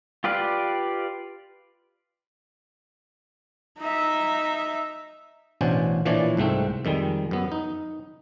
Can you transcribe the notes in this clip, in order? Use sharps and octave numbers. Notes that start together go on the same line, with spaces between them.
F4 G4 B4 D5 F5
D#4 E5
A1 B2 C#4 D4 C5 G#5
A#2 E3 F3 D4 C#5 D5
C2 G#2 A3 C4
F2 D#3 G3 G#3
F#2 B3
D#4